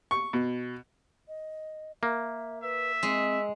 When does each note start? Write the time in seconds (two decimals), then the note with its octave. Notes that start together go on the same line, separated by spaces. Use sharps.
0.11 C#6
0.33 B2
1.28 D#5
2.03 A#3 E5
2.63 B4 E5
3.03 G#3 C4